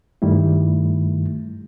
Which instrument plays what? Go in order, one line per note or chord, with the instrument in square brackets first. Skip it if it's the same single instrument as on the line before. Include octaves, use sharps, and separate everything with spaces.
[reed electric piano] G2 D#3 G3 A3 E4